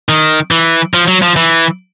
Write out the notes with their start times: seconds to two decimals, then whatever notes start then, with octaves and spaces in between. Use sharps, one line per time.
0.09 D#3
0.51 E3
0.94 F3
1.08 F#3
1.22 F3
1.36 E3